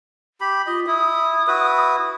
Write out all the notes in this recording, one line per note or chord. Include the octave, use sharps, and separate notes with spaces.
G4 B5
F4 D#5
E4 D#6
E4 F#4 B4